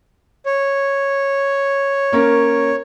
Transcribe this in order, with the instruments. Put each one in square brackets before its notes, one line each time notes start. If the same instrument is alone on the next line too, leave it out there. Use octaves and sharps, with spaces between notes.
[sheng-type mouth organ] C#5
[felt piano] A#3 C#4 A#4